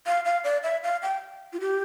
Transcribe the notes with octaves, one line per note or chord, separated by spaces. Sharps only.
F5
F5
D5
E5
F5
G5
F4
G4